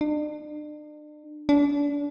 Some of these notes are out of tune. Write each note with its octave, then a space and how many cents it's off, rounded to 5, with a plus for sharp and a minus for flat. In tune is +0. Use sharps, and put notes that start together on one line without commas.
D4 +40
D4 -30